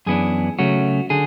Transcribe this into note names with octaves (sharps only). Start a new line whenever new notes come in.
F#2 E3 B3 D4 G#4
C#3 F#3 A3 C#4 F#4
D3 G#4